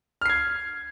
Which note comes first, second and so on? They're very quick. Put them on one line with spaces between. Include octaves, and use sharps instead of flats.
F6 C7 G#6